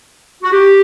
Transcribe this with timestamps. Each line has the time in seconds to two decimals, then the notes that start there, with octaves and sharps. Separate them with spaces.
0.43 F#4
0.52 G4